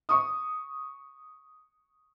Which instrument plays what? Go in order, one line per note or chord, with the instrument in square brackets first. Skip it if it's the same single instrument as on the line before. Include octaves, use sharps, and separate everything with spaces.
[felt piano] C#6 D#6